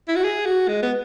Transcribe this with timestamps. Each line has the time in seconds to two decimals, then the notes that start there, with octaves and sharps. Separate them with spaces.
0.08 E4
0.16 F#4
0.24 G#4
0.46 F#4
0.68 G#3
0.83 B3